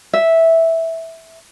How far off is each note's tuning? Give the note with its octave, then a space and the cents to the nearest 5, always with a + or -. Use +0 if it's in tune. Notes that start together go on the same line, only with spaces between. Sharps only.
E5 -10